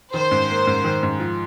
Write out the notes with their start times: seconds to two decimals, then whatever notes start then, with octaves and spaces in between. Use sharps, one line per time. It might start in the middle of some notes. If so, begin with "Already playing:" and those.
0.14 D#3 C5
0.31 G#2
0.49 A#3
0.67 G#2
0.84 D#3
1.03 G#2
1.20 F3